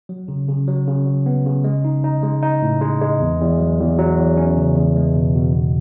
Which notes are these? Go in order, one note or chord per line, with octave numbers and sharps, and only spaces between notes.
F#3
C#3
C#3
F#3
C#3
F#3
B3
C#3
G#3
D#4
D#4
G#3
D#4
A2
G#3
G#3
E2
E2
F#3
E2
F#3
E2
C#4
C#3
E2
G#3
B2
B2
E2